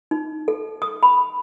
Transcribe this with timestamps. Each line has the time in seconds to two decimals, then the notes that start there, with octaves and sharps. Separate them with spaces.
0.11 D#4
0.48 A4
0.82 D#6
1.03 B5